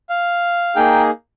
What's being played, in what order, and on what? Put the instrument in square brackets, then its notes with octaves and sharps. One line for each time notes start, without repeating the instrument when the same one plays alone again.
[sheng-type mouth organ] F5
A#3 D#4 G#4 G5